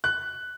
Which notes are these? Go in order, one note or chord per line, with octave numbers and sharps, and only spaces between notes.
F#6